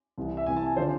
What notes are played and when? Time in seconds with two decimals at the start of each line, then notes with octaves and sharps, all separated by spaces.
0.18 C2 C3 E3
0.37 E5
0.46 C2 C3 E3 G#5
0.56 A5
0.66 G#5
0.76 D3 F3 C5